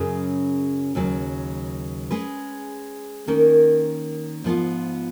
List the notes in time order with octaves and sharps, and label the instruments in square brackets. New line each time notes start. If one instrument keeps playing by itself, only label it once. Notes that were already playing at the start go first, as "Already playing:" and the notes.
Already playing: [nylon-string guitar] F#2 C#3 F#3 C#4 G#4
D#2 C#3 F#3
G#3 C#4 G#4 B4
D#3 A#3 C#4
G#2 F3 B3 F4